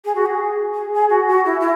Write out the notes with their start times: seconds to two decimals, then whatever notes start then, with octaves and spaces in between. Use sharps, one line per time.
0.05 G#4
0.15 F#4
0.26 G#4
0.74 G#4
0.93 G#4
1.10 F#4
1.28 F#4
1.45 E4
1.60 E4